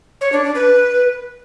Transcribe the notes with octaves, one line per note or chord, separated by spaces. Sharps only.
C#5
D4
D4
B4